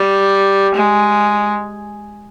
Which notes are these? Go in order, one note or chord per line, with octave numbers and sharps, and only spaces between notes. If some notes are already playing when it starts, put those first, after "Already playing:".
Already playing: G3
G#3